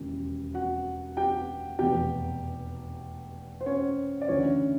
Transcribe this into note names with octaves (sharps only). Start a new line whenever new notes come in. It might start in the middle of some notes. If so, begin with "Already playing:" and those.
Already playing: E1 D#2 C#3 E3
F#4 F#5
G4 G5
F1 E2 B2 G4 G5
C5
C#4 C#5
D5
D2 C#3 E3 C#4 C#5